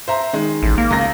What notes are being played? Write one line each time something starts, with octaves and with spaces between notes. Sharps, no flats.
C5 E5 A#5
D#3 G#3
A1
A#3
C#2 A#6